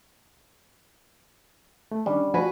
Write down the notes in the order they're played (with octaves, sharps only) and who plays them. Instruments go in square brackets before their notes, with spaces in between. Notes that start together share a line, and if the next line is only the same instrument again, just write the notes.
[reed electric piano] A3
[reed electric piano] D#3 C#4 D4 [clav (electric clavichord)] G3
[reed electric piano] F3 G#5 [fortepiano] F#4 B4